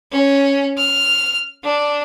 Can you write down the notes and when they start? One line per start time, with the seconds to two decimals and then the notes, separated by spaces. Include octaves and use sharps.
0.12 C#4
0.78 F6
1.64 D4